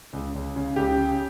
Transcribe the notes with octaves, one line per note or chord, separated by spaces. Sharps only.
C#2
C#2
C#3
C#2 G4
C#3